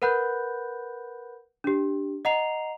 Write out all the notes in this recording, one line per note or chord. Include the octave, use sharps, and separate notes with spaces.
A#4 B4 F#5 B5 F#6 G6
D4 G4
D#5 F#5 A#5 C7 F7